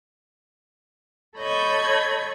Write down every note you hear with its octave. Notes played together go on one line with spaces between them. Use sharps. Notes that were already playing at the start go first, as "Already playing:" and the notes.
A4 C#5 D#5 B5 G6 G#6